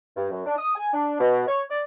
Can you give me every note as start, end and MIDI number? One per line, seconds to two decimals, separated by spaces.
0.16 0.29 43
0.30 0.42 42
0.45 0.55 62
0.57 0.72 87
0.75 0.90 80
0.93 1.17 62
1.19 1.45 47
1.47 1.62 73
1.69 1.81 74